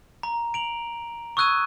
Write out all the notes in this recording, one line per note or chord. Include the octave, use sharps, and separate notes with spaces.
A#5
D7 F7 F#7
C#6 D#6 E6 F#6 G#6 D#7